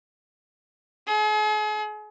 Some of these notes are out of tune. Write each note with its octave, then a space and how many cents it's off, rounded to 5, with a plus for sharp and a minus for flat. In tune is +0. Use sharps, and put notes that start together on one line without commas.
G#4 +40